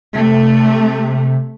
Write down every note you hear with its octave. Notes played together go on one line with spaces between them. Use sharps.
C3 A3